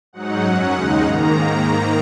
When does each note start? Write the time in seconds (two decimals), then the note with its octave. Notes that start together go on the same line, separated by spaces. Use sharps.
0.13 G#2 F#3 D#4 F#5
0.43 F#2 F#3 C#4
0.73 D#2 C#3 G#3 D#4
1.02 G#2 D#3 A#3 A#5